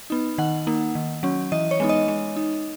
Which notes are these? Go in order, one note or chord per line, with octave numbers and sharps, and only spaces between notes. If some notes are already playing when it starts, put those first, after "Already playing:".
B3 D#4
D#3 F#5
A#3 D#4
D#3
F#3 C#4
E3 D#5
C#5
G#3 B3 D#4
D#5
G#3
D#4